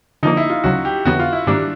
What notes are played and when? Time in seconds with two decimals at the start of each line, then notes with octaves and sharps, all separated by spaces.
0.23 D3 F3 A#3 D#4
0.37 E4
0.50 F4
0.64 D2 C#3 F#3 F#4
0.85 G4
1.05 F2 D3 F#3 B3 F#4
1.19 F4
1.33 E4
1.47 G#2 D#3 G3 A#3 D4